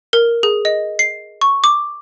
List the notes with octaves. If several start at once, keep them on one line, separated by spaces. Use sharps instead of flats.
A#4
G#4
D#5
C7
C#6
D6